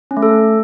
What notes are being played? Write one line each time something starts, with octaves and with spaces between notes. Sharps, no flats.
C#4
A3
A4